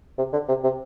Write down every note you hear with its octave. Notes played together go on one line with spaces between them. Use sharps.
C3
D3
C3
C3